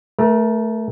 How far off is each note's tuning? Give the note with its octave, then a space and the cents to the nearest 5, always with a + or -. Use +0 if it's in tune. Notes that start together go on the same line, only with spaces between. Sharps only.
A3 +0 A#4 +35